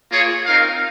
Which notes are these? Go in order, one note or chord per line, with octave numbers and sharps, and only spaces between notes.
A#3 F4 G#4 C#5
C4 D#4 A#4 F5